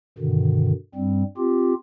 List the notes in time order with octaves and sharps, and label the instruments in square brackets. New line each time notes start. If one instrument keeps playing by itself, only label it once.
[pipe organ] G2 B2 D3 D#3
G2 G3 C4
C4 F4 G4